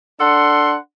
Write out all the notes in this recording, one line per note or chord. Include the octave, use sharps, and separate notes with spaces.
D4 A4 F#5 C6